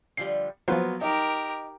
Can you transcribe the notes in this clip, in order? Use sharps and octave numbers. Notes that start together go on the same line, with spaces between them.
D3 F3 G3 C7
F3 F#3 A#3 B3 F4 C5
D#4 G4 A#4